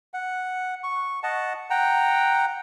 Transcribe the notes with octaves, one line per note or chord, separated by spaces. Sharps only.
F#5
C#6
D#5 F#5 A5
F#5 G5 A#5